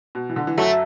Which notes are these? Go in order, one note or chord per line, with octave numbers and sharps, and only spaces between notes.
B2
E3
D3
E3
F#2 F#3 A3